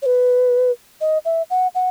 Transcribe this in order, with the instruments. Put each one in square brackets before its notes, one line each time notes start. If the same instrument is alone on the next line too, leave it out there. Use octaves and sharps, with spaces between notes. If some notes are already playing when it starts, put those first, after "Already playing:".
[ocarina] C#5
B4
D#5
E5
F#5
F#5